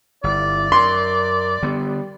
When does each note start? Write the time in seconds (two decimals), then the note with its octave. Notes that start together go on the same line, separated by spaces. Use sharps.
0.24 G1 E4 D5
0.72 F#2 A#4 C6
1.63 D3 G3 B3